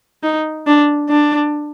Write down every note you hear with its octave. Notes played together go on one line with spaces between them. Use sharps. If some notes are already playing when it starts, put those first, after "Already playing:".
D#4
D4
D4